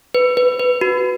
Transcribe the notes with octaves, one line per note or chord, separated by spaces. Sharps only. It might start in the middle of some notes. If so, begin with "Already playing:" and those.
B4
B4
B4
F#4